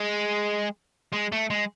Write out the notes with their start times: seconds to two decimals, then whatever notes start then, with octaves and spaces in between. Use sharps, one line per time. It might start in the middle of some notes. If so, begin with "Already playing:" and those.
Already playing: G#3
1.13 G#3
1.32 A3
1.50 G#3